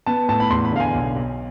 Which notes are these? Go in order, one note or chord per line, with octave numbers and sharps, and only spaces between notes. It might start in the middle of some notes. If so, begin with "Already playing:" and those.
B3 A5
A2 A5
B5
E2 C6
B5
D3 F5
G#5
B1
B1